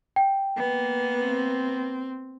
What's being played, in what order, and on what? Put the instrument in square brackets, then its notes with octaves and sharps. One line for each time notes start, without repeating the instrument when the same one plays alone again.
[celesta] G5
[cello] A#3 B3
[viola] C4